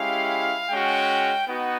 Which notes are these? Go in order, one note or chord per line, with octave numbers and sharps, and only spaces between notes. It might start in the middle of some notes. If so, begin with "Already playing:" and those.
Already playing: G#3 C#4 E4 G4 F5
G#3 C#4 F#4 G5
B3 D#4 F#4 F#5